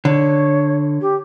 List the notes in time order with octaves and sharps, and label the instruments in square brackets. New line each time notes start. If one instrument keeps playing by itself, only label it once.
[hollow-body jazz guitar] D3 [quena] C#5
[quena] G4